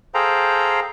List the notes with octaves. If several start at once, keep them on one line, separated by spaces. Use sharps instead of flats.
G#4 A4 C5 F5 G5 A#5